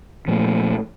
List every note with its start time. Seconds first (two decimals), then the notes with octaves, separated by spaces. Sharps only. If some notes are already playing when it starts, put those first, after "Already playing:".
0.27 A#2 F3 A3